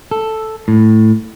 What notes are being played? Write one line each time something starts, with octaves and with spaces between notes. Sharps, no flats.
A4
A2